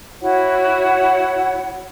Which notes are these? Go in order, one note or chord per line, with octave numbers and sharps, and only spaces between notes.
E4 F#4 C#5 F#5